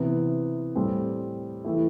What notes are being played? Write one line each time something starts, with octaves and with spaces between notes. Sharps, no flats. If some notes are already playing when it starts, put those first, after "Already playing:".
Already playing: C3 E3 B3
A2 G3 C4
E3 A3 E4 G4